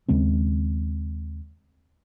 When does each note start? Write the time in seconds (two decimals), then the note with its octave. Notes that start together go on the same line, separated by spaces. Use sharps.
0.08 D#2 C#3 G#3 C4